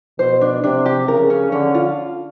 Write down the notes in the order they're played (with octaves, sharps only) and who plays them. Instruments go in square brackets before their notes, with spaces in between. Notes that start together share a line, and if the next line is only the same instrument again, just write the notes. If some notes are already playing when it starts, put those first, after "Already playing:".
[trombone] B2 [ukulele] C5
[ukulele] D4
[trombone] C3 [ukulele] D4
[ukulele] G4
[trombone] C#3 [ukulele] A#4
[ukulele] C#4
[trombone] D3 [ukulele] C#4
[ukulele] F4